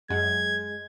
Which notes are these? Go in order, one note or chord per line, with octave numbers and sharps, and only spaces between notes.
F#2 G#3 G#6